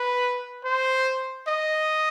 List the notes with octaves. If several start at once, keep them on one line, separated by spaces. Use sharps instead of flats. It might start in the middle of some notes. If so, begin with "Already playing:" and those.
Already playing: B4
C5
D#5